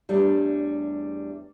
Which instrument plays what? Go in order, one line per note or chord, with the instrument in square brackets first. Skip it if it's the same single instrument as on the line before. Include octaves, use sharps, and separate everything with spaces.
[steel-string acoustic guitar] E2 G3 A3 D4 C#5